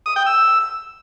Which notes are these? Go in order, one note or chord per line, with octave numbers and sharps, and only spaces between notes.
D#6
G5
E6